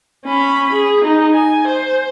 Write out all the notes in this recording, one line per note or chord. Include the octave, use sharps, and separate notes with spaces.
C#4 B5
G#4
D#4
G#5
C5